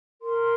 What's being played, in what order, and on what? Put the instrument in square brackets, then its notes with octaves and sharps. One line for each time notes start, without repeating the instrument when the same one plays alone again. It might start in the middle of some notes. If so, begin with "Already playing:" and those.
[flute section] A#4 C6